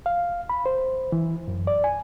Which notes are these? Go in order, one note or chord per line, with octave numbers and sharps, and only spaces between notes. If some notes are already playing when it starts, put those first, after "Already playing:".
F5
B5
C5
E3
F#2
D5
G#5